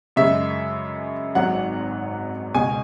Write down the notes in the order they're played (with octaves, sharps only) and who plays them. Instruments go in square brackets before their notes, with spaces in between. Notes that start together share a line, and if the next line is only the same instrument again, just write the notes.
[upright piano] F#2 C#3 G#3 [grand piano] E5
[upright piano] G#1 G#2 F#3 [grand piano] F#5
[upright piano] C#2 B2 G#3 [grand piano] G#5